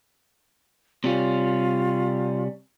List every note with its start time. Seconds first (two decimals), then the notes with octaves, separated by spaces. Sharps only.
1.04 C3 G3 C#4 F4